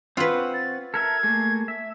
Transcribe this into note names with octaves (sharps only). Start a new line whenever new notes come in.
C4 F4 B4 C#5 F#5
A6
A4 A#4 E5 G#6
A3 A#3 G#4
E5